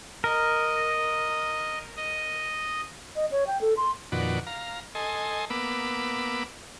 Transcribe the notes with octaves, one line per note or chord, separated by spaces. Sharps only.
A#4 D#5
D#5
D#5
C#5
G5
A4
C6
F2 A#2 D#3 F#4 B4 D5
F5 A#5
A4 D#5 G#5 C6
A#3 B3 B5 D6 E6